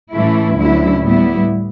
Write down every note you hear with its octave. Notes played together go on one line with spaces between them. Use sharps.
A2 E3 A3 C#4 E4
D2 D3 F#3 C#4 E4
A2 G3 B3 E4